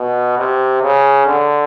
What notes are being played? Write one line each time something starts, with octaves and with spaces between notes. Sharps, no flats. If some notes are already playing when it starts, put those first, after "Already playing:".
Already playing: B2
C3
C#3
D3